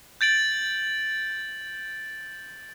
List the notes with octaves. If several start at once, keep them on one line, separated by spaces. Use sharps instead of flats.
G6 A6 D7 F#7